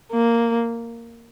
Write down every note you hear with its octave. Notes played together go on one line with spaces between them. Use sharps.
A#3